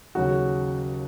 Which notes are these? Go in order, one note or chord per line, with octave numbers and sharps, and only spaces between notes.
D#2 C#3 F#3 F#4